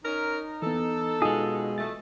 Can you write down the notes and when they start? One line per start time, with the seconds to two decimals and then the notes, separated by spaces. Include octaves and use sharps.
0.04 C#4 D#4 A#4
0.62 E3 B3 A4
1.22 B2 G#3 D#4 F4 G#4
1.78 E3 A3 A6